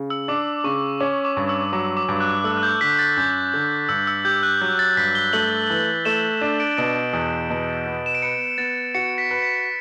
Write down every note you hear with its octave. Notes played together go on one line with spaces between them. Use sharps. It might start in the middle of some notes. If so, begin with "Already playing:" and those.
Already playing: C#3
E6
D4 D6
C#3 C#6
C#4 D6
D6
G2
E6
F#3 D6
D6
G2
F#6
A3 E6
F#6
G6
D3 B6
A6
F#2 G6
D3
G2 E6
E6
G4 G6
F#6
F#3 G6
A6
G2 B6
G7
A3 F#7
E3
A3 E7
D4 E7
D7
B2 D7
E2
B2
B3
E7
D7
B4 C#7
B3 A6
F#4 C#7
B6
B4
B6